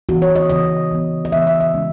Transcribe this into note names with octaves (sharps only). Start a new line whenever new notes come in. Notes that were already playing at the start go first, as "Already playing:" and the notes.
C#3 E3 B3 F#4
C#5
D#5
C#3 E3 B3 D#5
C#3 E3 B3
D#5
C#3 E3 B3 E5
E5
E5
C#3 G#3 C#4